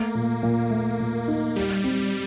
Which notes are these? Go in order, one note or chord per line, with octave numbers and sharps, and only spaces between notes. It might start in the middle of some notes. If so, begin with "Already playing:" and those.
Already playing: A3 A#3
A#2
A#2
A3
A#2
D#4
G3 G4
C4